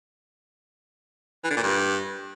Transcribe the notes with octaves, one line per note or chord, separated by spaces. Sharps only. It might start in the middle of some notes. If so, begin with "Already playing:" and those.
E3
D3
A#2
G2